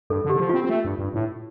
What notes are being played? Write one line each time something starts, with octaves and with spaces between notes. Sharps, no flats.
G2 A4
D3
G4
D3
F3
C4 F4
C4
A3
G2
G2
A2